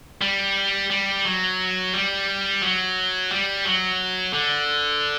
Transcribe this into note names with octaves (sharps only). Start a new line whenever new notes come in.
G3
G3
F#3
G3
F#3
G3
F#3
D3